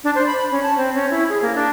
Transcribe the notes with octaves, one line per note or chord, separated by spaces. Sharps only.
D4
C5
B5
C#4
A5
C4
C#4
E4
G#4
A#3
D4